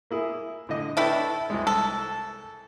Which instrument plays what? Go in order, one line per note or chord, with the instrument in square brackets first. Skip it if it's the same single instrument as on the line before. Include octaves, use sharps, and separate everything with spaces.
[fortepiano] A#3 E4 G#4
A2 D3 D#5
[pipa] A3 E4 A4 [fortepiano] D4 B4 G5
[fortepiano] C2 G#3
[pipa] A4